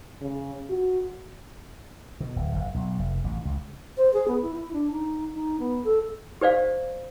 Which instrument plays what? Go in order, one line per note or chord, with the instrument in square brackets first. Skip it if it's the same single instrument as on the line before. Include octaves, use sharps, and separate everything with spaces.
[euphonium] C#3
F#4
[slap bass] B2
D1
F#1
B1
F1
A1
C#2
[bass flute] C5
G#4
B3
E4
E4
D4
D#4
D#4
B3
A4
[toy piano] G4 C5 D5 F5